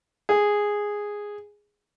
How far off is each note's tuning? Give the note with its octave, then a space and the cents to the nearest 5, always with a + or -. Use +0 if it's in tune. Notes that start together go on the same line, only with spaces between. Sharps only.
G#4 -5